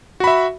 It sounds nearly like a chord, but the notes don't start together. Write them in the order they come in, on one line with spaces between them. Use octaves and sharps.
F#4 B5 E5